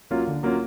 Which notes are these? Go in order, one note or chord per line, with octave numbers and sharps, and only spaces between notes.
F#3 A#3 C#4 F4
D3
F#3 A#3 C#4 F4